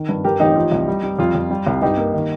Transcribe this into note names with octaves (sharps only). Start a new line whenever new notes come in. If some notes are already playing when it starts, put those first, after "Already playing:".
Already playing: D#3
G2
G2 G4 A#4
A1 D#4 G4
F3
C2
G3
G3
F2 F4
F2
G3
C2
G2 D#4 G4
A#3
D#3